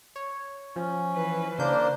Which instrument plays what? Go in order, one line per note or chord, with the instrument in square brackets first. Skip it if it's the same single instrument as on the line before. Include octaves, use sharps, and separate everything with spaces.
[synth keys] C#5
[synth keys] F3 [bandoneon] C#4
[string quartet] E3 B4
[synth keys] C#3 G6 [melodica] A#3 D4 A#4 [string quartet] C5